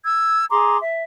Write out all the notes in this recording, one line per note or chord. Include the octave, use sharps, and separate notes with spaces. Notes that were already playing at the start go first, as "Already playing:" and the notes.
E6 G#6
G#4 A#5 C6 D6
E5